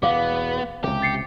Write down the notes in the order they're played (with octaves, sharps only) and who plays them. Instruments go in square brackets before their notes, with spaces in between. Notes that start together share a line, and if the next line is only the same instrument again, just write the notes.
[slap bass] E2 B2 [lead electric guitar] B3 [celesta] F5 D6
[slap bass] C#2 C3 [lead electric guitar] G4
[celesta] A6 C7 C#7